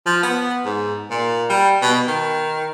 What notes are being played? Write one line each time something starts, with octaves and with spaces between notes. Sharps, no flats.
F3
B3
G#2
A#2
G3
B2
D#3